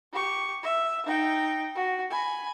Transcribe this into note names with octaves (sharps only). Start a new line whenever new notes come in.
G4 C#6
E5
D#4 G5
F#4
G#5 B5